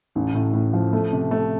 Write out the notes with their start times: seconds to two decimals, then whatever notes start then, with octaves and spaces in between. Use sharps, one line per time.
0.15 A1
0.34 A2
0.53 A2
0.73 F3
0.93 A3
1.12 C3
1.31 A3